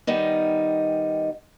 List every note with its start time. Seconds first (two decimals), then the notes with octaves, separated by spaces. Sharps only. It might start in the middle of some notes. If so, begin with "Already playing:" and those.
0.07 D#3 G3 B3 D#4